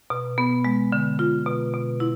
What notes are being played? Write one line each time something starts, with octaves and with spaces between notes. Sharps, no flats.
B2
B3
G#3
D3
F4
B2
B2
E4